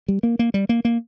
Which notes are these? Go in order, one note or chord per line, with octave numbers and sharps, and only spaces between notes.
G3
A#3
A#3
G3
A#3
A#3